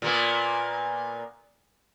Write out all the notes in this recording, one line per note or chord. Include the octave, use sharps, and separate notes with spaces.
A#2 A#3 B3